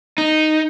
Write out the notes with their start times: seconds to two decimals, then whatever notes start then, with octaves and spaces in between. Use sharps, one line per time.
0.18 D#4